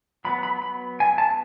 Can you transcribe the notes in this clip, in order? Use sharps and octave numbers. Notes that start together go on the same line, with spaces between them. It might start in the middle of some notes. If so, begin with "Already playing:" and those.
F#3 B3 B5
B5
B5
G#5
A5